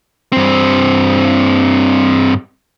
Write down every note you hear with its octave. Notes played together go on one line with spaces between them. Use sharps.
G2 C4